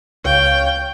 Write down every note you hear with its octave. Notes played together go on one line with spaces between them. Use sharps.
C#2 C#5 F5 G5